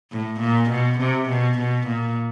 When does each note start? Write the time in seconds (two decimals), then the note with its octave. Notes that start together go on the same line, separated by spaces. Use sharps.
0.11 A2
0.40 A#2
0.70 B2
1.00 C3
1.29 B2
1.58 B2
1.87 A#2